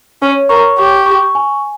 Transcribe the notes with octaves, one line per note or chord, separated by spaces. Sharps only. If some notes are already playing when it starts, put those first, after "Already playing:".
C#4 C#5
A#4 C#6
G4 C#6
C#6
G#5